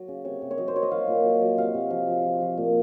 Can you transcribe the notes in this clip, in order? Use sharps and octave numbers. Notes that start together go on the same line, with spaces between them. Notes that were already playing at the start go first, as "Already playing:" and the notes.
Already playing: F#3
C#3
C3 C#5
C3
C#5
F#3 D#5
C5
F#3 C#5
D#5
F#3 F5
A#2
F#3
F#3
C3 F5
C3
F3
F3
F3
F3
A#2